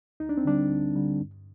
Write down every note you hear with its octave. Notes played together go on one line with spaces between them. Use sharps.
D2 D#4
D4
C4
D3 G3 D4
D2
D3 G3
G2